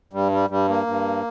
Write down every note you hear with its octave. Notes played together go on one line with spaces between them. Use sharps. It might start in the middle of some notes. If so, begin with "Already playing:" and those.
G2 G3
G3
G2 G3
A#3
G2